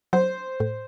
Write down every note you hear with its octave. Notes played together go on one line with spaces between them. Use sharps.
F#3 C5
A2